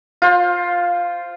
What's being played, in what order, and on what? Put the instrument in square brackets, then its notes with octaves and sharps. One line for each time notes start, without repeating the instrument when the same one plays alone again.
[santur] F4 C5